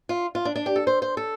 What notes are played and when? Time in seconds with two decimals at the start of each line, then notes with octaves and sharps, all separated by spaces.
0.09 F4
0.35 F4
0.45 D4
0.56 D4
0.66 G4
0.76 A4
0.87 C5
1.02 C5
1.17 A4